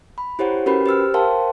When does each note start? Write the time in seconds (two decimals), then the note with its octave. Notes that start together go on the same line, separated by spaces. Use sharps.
0.18 B5
0.39 E4 G4 C5 C#5 F#5
0.66 C#4 F#4 G4 A#4 B4 B5
0.86 G4 C5 E6 F6
1.14 A#4 C5 F5 G5 A5 C6